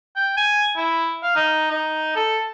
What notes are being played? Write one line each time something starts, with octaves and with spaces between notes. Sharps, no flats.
G5
G#5
E4
F5
D#4
D#4
A4